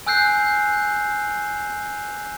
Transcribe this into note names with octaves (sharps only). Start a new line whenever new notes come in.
G#5 E6 F#6 G6 C7